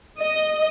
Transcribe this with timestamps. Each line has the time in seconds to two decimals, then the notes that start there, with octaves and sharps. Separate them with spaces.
0.20 D#5